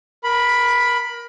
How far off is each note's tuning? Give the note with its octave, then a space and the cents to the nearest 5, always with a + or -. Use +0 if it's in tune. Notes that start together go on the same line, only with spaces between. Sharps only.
A#4 +25 B5 +0